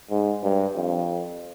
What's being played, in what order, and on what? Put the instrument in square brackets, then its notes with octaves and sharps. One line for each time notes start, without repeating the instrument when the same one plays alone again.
[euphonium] G#2
G2
F2